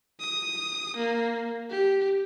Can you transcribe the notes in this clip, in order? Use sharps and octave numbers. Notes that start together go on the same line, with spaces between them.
D#6
A#3
G4